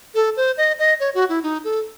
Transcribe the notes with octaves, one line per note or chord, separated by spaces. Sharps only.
A4
C5
D#5
D#5
C#5
F#4
E4
D#4
A4